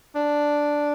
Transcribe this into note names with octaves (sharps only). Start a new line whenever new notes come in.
D4